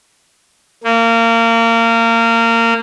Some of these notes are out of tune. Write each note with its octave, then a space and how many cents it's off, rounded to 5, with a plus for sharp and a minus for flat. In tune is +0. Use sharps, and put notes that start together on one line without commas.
A#3 -25